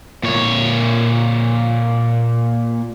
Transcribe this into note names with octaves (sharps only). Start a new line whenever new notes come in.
A#2 C#5